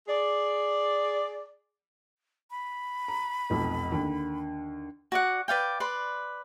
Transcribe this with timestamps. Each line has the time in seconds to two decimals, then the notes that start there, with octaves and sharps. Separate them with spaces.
0.08 G#4 D5
2.50 B5
3.08 A#5
3.50 F1 B1 F2
3.92 D#2 D3
5.12 F#4 D5 F#5
5.48 B4 D5 F5 G5
5.80 B4 D5 C6